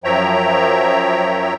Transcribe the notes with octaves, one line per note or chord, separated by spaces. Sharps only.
F#2 F3 C#5 E5 G5 A#5